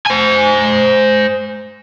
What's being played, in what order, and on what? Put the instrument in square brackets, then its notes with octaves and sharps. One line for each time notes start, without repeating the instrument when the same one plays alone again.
[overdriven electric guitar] C5 G#5